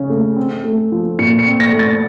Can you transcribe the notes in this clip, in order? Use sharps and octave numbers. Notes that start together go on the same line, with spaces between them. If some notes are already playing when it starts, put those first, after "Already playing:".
Already playing: C#3 C#4
A3
C4
A3
F3
A#2 C#7
C#7
C4
A#6
A3
A6